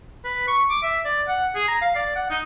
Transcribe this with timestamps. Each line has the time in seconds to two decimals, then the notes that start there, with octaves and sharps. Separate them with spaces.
0.25 B4
0.48 C#6
0.70 D6
0.83 E5
1.05 D5
1.28 F#5
1.55 G#4
1.68 A#5
1.82 F5
1.96 D5
2.16 F#5
2.30 D#4